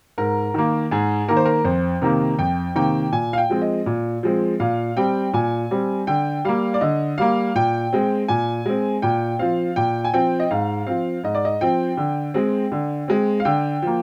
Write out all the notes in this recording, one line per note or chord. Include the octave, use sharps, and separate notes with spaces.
G#2 A#4
D#3 A#3
G#2 G#4
D#3 A#3 A#4
C5
A#4
F2 C5
C3 D#3 A#3 A#4
F2 G5
C3 D#3 A#3 G5
A#2 G#5
F5
G5
F3 G#3 C4
D#5
A#2
F3 G#3 C4
A#2 F5
G3 C4 G5
A#2 G#5
G3 C4
D3 G5
G3 A#3 F5
D5
D3 D#5
G3 A#3 F5
A#2 G5
G#3 C4
A#2 G#5
G#3 C4
A#2 G5
F3 C4 F5
A#2 G5
G#5
F3 C4 G5
D#5
G#2 F5
F3 C4 F5
G#2 D#5
D5
D#5
F3 C4 G5
D3
G#3 C4
D3
G#3 C4
F5
D3 G5
F3 A#3